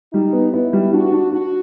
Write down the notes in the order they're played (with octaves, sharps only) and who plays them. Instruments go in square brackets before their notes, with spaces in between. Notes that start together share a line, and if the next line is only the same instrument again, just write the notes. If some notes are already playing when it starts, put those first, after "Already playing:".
[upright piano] G3 [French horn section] D#4
[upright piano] B3
[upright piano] B3 [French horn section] E4
[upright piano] G3
[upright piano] D4 [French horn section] F#4
[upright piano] D4
[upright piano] D4 [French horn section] F#4